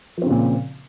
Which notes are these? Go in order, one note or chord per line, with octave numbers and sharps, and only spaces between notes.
A#2 C#3 F3 C4